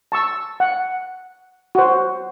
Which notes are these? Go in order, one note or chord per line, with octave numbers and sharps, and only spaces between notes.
A5 C#6 E6
F#5
F#4 C5